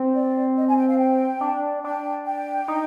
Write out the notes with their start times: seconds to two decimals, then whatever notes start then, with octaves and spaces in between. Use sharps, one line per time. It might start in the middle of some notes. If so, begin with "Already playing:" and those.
Already playing: C4
0.14 D5
0.57 D#5
0.67 G#5
0.78 G5
0.88 F5
0.98 G5
1.41 D4
1.84 D4 G5
2.26 G5
2.68 D#4